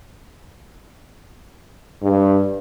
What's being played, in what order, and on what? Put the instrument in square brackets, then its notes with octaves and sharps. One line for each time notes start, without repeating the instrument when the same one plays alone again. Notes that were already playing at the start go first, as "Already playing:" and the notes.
[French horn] G2